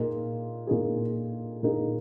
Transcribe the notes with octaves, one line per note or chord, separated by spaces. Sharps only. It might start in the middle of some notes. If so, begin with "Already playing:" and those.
Already playing: A#2 A#3 D#4 G#4
A#2 A#3 D#4 G#4
A#2 A#3 D#4 G#4